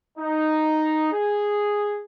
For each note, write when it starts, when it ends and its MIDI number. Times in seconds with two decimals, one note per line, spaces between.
0.18 1.10 63
1.12 2.02 68